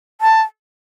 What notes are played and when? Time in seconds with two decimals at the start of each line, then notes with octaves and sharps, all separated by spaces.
0.21 A5